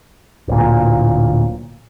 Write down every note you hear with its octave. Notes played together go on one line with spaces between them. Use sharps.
D1 A#2